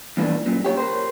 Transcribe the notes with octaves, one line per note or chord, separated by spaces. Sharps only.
E2 G2 A#2 E3 F3 D4
F#2 A#2
G4 C#5
A#4 C5